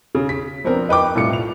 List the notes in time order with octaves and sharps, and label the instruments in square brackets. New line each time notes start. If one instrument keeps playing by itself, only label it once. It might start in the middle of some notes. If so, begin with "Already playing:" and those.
[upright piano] C#3
B6
F3 B3 C4 D4 A#4
D#4 B4 G5 D6
C2 A2 F4 C#7
F7